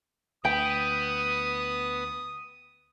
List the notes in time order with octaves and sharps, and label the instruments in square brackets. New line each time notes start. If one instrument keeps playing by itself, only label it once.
[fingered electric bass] D2 [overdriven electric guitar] B3 [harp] G5 [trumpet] D#6